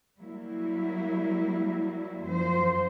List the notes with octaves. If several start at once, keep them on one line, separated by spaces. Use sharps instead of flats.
F#3 G3 A#3 E4
F#2 F3 C5